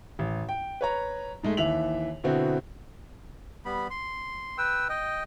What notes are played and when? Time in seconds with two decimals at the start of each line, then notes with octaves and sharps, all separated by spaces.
0.19 A1
0.49 G5
0.81 B4 C#5 A#5
1.43 G#2 G#3 A3
1.57 D#2 E3 E5 F7 F#7
2.24 B2 D3 B3 C4 E4 F#4
3.65 G3 B3 B5
3.90 C6
4.58 B4 G5 E6
4.89 D#5 G5